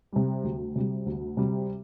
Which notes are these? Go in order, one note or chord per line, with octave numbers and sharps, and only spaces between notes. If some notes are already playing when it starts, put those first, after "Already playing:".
C3 G3
D2
C3 G3
D2
C3 G3